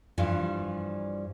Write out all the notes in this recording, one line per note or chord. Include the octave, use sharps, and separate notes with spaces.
G2 E3 F3 G3